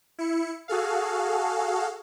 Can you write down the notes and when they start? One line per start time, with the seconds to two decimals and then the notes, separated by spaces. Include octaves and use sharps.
0.18 E4 C#7
0.68 F#4 G#4 A4 F5